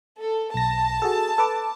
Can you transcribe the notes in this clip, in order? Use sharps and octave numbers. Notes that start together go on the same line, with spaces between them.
A4
B1 A5 A#6
F#4 G#4 A4
A4 B4 D6